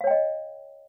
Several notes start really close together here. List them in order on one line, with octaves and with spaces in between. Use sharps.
F5 C#5 G5 D#5